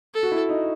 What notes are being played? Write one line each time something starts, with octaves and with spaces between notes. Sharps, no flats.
A4
F#4
E4
D#4